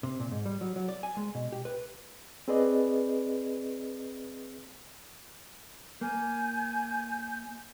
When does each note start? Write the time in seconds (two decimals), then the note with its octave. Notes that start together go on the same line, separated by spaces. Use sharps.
0.03 C3
0.20 A#2
0.31 G#2
0.46 G3
0.61 F#3
0.76 F#3
0.89 D5
1.03 G#5
1.17 G#3
1.35 B2
1.52 G4
1.65 B4
2.48 C4 G#4 B4 D5 D#5
6.01 A#3 G#5 G6